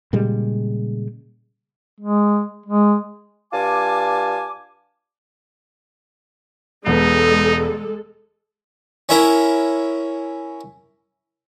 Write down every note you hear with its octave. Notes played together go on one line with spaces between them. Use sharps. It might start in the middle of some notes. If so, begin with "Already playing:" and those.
A#2 C#3 G3 G#3
G#3
G#3
G2 F4 G#5 A5 D6
E1 G#3 B3 D#4 A4
C#4 E4 A#4